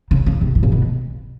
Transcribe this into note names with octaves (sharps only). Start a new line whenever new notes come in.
C#3
C#3
C3
A2
A#2
B2